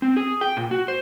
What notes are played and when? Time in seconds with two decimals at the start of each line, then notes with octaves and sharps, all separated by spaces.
0.02 C4
0.16 G#4
0.41 G5
0.57 A#2
0.71 F#4
0.88 C5